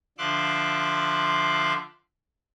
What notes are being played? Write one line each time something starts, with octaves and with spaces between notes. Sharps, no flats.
D3 F3 E5 C6 D6 F#6